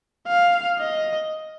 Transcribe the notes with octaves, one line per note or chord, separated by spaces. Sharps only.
F5
D#5